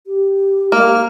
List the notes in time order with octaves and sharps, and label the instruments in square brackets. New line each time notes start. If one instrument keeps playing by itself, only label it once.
[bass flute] G4
[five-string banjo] A#3 [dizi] F6